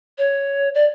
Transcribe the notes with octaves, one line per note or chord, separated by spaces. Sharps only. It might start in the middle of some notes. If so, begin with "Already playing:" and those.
C#5
D5